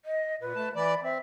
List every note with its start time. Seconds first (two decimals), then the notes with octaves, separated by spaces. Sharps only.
0.05 D#5
0.41 A#2 B4
0.55 A3 A5
0.75 E3 D5 B5
1.03 C4 E5